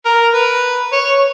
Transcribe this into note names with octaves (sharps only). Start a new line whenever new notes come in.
A#4
B4
C#5